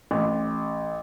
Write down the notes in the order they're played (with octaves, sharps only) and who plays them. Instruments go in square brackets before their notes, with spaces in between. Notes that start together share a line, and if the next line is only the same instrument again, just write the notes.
[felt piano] A1